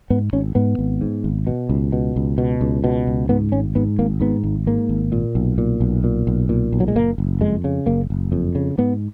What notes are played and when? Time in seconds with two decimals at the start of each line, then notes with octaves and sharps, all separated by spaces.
0.10 G#2 B3
0.33 G#1 C#4
0.55 G#2 B3
0.79 G#1
1.01 G#2
1.24 G#1
1.47 B2
1.69 C#2
1.92 B2
2.16 C#2
2.38 B2
2.61 C#2
2.84 B2
3.07 C#2
3.29 G#2 B3
3.52 G#1 C#4
3.75 G#2 B3
3.99 G#1 A#3
4.21 G#2 B3
4.43 G#1
4.67 G#2 A#3
4.89 G#1
5.12 A#2
5.35 B1
5.58 A#2
5.80 B1
6.04 A#2
6.27 B1
6.49 A#2
6.73 B1
6.80 F#3
6.88 G#3
6.96 F#1 A#3
7.18 F#1
7.41 F2 G#3
7.64 C#3
7.86 F#1 A#3
8.10 F#1
8.32 F2
8.55 C#3
8.78 G#2 B3